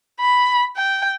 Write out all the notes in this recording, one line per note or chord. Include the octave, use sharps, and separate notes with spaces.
B5
G5